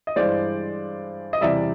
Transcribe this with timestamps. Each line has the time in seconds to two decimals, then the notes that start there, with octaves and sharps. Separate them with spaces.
0.07 D#5
0.16 G2 E3 G#3 C5 D5
1.33 D#5
1.41 E2 C3 E3 G3 D5 E5